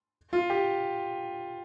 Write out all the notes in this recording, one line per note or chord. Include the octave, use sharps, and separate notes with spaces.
F4
G4